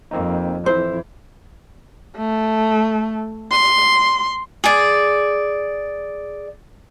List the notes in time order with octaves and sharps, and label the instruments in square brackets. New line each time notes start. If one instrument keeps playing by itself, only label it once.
[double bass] F2 [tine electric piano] A#3 C4 D#4
[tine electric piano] F2 [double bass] E3 E4 [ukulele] C5
[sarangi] A3
C6
[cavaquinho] G#4 D5